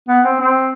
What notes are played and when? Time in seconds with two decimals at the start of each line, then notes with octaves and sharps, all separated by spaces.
0.08 B3
0.24 C4
0.40 C4